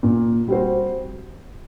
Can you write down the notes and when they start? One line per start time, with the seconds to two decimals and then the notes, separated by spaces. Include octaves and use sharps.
0.03 A#2
0.48 G3 C4 F#4 C5